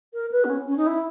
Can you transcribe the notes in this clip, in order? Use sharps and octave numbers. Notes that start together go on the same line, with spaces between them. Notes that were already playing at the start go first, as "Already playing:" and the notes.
A#4
B4
B3
C#4
C#4
D#4
E4